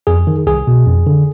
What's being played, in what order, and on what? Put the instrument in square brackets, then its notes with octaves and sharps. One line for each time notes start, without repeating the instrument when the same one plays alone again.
[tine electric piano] F2 G#4
D#3
C2 G#4
B2
F2
D3